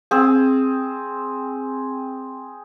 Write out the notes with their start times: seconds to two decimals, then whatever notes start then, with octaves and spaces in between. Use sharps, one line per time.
0.11 C4 G#4